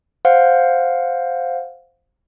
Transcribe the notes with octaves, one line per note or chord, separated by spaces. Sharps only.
C5 F5 F#5